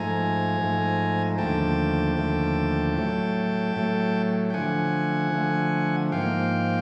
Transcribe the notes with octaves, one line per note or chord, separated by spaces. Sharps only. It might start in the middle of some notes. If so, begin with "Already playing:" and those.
Already playing: G#2 F3 A3 G#5 A#5
G#2 F3 A3
D#2 D3 F3 A3 G5 A5
D#2 D3 F3 A3
A2 F#3 A3
A2 F#3 A3
G5
D3 F3 A3 F#5 G#5
D3 F3 A3
G#2 F3 A#3 F5 G5